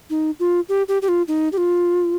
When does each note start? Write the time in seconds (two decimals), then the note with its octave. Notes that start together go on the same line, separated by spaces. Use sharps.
0.10 D#4
0.40 F4
0.69 G4
0.88 G4
1.02 G4
1.08 F4
1.28 D#4
1.53 G4
1.58 F4